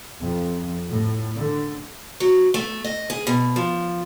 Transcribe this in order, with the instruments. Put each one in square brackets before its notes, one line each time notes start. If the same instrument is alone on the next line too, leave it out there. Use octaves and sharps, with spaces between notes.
[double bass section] F2
A2
D3
[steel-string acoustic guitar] F#3
A3
D#5
G#4
B2
F3